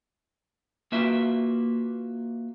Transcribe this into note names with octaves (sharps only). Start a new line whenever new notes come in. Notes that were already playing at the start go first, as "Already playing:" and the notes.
A#3 F4 F#4 B4 E5